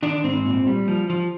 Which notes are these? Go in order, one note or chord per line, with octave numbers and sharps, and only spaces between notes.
D#3 D4
G#2 C4
A#2
G3
F3
F3